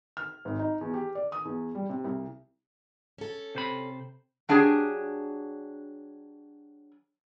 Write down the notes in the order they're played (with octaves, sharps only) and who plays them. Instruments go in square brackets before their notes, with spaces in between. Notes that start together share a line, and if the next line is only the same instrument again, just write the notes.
[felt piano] F6
G#1
D#4
E2
G4
D5
D#6
E2
G3
C3
C2
[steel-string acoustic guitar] C#4 A4
[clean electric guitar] C3 C5 B5
[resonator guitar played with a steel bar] F#3 D4 G4 G#4